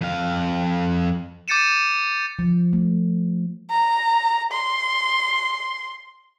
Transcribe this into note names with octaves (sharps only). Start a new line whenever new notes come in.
F2 F5
D6 G6 A6 C#7 D#7 E7
F3
A3
A#5
C6